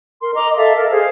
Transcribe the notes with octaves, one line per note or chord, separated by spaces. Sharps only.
A#4 C6
D#5 A#5 D6
A4 E5 F5
A4 A#4 D#5 F6
G#4 C5 F5